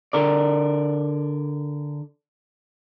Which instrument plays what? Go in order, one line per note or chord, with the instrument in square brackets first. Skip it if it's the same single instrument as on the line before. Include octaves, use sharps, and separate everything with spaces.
[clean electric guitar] D3 A#4 D5